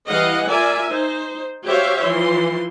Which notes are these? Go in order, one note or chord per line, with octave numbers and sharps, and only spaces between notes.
E3 G3 D#5 F5 F#5
F4 A#4 D5 E5 G#5
D#4 C5
F#4 G4 C5 C#5 E5 F5
E3 F3 C6